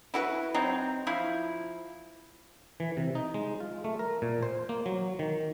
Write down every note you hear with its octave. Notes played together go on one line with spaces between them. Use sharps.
E4 F#4 B4
F#3 C4 D#4
F3 E4 F4
E3
C3
D#4
G#3
F4
A3
A#4
A#2
C5
A#3
F#3
D#3